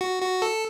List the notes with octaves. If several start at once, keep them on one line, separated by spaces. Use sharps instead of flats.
F#4
F#4
A4